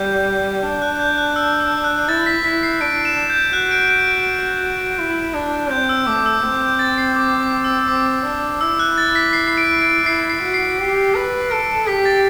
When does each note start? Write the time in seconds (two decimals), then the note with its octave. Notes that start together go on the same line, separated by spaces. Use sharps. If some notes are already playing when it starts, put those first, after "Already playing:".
Already playing: G3 G6
0.63 D4
0.82 F#6
0.99 G6
1.18 F#6
1.36 E6
1.60 E6
1.84 F#6
2.09 E4 A6
2.26 B6
2.44 E4 B6
2.63 C7
2.81 D4 D7
3.05 E7
3.30 G6
3.53 F#4 F#6
3.71 D7
3.89 D7
4.08 D7
4.99 E4
5.34 D4
5.71 C4 G6
5.89 E6
6.07 A3 D6
6.26 E6
6.43 C4 G6
6.61 G6
6.79 A6
6.98 C7
7.16 D6
7.40 D6
7.64 E6
7.79 E6
7.88 C4 D6
8.25 D4
8.61 E4 E6
8.79 F#6
8.98 A6
9.15 B6
9.33 C7
9.48 C7
9.58 D7
9.82 D7
10.05 E4 C7
10.29 C7
10.42 F#4
10.54 C7
10.79 G4
11.15 B4
11.51 A4 D7
11.87 G4 B6
12.05 A6